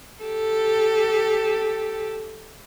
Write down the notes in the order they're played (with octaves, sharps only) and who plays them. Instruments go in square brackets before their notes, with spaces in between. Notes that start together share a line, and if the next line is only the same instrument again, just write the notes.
[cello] G4 A4